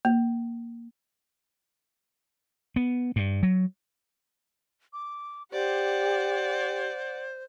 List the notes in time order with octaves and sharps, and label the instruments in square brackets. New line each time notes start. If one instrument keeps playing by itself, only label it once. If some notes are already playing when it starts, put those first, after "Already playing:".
[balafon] A#3
[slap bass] B3
G2
F#3
[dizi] D6
[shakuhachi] G4 [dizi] C5 [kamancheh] D5 F#5